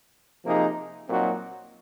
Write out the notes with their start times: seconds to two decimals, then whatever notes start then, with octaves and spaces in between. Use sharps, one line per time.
0.44 C3 F3 A#3 D#4 G#4
1.08 A#2 F#3 C4 D#4 F#4